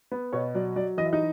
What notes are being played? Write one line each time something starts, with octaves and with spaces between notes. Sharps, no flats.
B3
B2 C#5
F#3 D5
F#3 D5
E3 D#5
E5
D#4 D#5